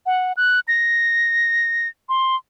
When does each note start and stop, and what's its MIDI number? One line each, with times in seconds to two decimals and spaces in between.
0.06 0.33 78
0.37 0.60 90
0.68 1.88 94
2.09 2.36 84